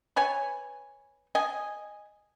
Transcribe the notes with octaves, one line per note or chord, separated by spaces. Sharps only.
B4 C#5 G#5
D#5 G#5